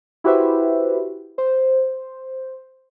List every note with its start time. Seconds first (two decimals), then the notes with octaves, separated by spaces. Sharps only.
0.24 E4 F#4 G4 B4 C5 E5
1.38 C5